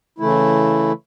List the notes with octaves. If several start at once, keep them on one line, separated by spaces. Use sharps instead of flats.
C#3 E3 A3 E4